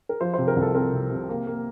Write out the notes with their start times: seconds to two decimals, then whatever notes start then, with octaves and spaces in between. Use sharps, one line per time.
0.09 A#4
0.21 F3 C5
0.34 C5
0.38 C3
0.48 A#4
0.56 C2
0.62 A4
0.74 C4 A#4
0.93 C3
1.11 C3
1.29 A#3
1.47 A#3